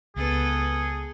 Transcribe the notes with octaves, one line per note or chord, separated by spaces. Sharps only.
C#2 B3 G#4 A4 B4